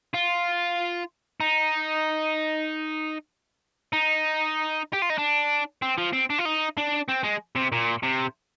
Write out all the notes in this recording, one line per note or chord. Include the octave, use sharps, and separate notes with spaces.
F4
D#4
D#4
G4
F4
D#4
D4
C4
F3
C4
D4
F4
D#4
D4
C4
G#3
C3
A#2
C3